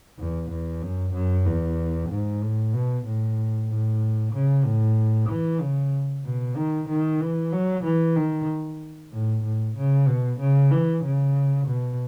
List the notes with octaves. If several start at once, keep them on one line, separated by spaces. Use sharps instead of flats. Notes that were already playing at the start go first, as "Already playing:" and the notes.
E2
E2
F#2
F#2
E2
G#2
A2
B2
A2
A2
C#3
A2
E3
C#3
B2
D#3
D#3
E3
F#3
E3
D#3
A2
A2
C#3
B2
C#3
E3
C#3
B2